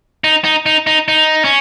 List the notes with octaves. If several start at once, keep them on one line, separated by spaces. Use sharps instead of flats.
D#4
D#4
D#4
D#4
D#4
C#4